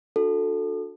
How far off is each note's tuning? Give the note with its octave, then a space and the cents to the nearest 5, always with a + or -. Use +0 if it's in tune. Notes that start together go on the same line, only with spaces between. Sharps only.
D4 +0 F#4 -30 A4 +0